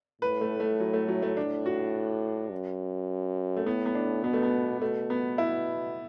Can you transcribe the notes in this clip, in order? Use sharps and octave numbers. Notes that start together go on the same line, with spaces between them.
A2 B4
A3
A3
F#3
A3
F#3
A3
A2 D4
F#4
F#2
A3
A2 B3
B3
D4
B2 B3
A3
B3
B2 A3
B3
E4